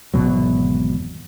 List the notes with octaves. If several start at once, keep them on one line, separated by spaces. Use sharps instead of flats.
G#1 E2 B2 F#3